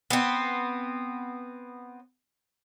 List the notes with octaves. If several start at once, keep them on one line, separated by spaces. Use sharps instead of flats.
B3 C4